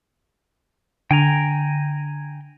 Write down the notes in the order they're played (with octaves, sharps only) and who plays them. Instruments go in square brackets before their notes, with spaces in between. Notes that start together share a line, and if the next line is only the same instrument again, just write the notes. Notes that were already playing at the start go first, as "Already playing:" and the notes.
[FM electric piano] D3 [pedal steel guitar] G5 G#5 A#5